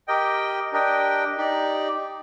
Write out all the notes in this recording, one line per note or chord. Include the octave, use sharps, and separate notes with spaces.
G4 A#4 D#5 G5
D4 G4 A#4 D#5 G5
D#4 G4 D5